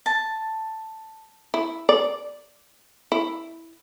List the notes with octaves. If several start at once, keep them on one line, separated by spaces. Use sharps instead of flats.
A5
E4
D5
E4